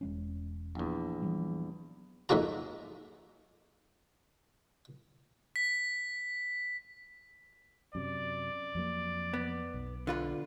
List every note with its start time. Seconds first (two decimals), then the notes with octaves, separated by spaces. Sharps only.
0.01 E1 G#3 C#4
0.75 A#1 E2
1.22 E3 F#3 G3
2.29 F2 G#2 A3 A#3 F#4 A#5
5.56 B6
7.95 F#2 C3 D5
8.75 F2 F#3 A#3
9.34 B3
9.74 B1
10.07 D3 F4 B4